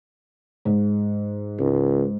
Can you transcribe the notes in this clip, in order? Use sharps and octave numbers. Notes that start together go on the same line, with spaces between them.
G#2
C#2